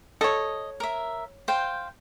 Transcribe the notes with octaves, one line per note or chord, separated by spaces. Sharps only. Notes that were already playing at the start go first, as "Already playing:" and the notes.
A4 C#5 D#5
A#4 E5
C5 F5 G5